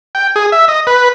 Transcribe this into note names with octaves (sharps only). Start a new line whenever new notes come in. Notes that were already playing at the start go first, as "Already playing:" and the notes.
G5
G#4
E5
D#5
B4